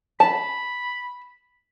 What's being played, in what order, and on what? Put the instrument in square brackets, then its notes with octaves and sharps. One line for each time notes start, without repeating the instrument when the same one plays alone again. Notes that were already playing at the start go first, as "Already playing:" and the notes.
[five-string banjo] A5 [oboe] B5